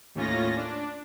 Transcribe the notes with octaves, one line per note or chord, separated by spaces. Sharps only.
D#2 A2 C#4 F4 A#6
D4